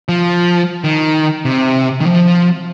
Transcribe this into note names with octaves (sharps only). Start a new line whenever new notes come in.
F3
D#3
C3
D#3
F3